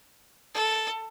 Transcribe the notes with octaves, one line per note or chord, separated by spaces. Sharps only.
A4